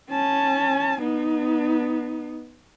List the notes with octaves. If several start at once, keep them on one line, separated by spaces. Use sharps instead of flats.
C#4 A5
B3 D#4